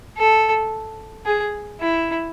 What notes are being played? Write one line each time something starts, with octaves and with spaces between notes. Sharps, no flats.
A4
G#4
E4